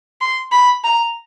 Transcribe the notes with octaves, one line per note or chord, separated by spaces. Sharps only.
C6
B5
A#5